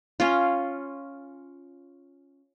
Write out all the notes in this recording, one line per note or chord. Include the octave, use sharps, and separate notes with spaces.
C#4 F4